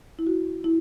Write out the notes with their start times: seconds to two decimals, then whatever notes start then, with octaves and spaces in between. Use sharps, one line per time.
0.19 E4
0.27 F#4
0.64 E4